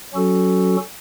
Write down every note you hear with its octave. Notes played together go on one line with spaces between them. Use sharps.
F#3 C#4 F#4 A4